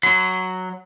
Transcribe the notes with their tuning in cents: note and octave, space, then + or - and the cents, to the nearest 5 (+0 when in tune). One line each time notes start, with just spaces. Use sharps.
F#3 +0 C6 -45